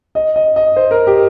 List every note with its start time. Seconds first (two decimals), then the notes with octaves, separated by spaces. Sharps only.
0.15 D#5
0.36 D#5
0.56 D#5
0.76 C5
0.91 A#4
1.07 G4